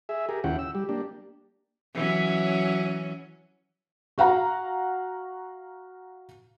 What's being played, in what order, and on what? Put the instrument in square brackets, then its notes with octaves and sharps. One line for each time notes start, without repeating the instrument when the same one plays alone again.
[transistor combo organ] G#4 E5
G4 G#4 A#4
D#2 C#4 E4 F4 F#5 G5
E6
G3 G4
A#3 D4 G4
[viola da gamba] E3 F#3 C#4
[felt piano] F#4 F5 F#5 A#5